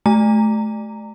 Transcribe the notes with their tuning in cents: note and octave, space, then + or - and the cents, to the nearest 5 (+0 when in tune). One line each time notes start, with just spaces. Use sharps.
A3 -30 A#5 -20